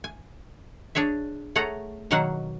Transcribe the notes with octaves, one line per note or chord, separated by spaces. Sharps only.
G#5
D4 G#4 C#5 E5
A3 G#4 A4 C#5 F#5 A#5
B2 D#3 F#3 A#3 F5 F#5